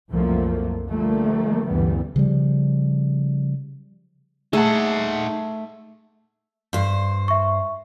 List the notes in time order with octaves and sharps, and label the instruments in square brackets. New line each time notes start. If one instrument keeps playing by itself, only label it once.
[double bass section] C2 F#2 F3 F#3 A3 A#3
D3 F3 G3 A3 A#3
D2 G2 C#3 E3 G3 B3
[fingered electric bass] C#3 F3 G3
[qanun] A3 [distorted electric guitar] D#4 F#5 [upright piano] G#4 A5
[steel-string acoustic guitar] G2 C5
[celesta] E5 C#6